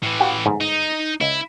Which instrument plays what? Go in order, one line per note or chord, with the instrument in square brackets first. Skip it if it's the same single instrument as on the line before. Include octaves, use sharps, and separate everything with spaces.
[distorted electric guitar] A2 E3
[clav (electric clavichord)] F#4 G4 F5
G1 G#2
[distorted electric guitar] D#4
[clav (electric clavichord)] C#2 [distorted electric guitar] E4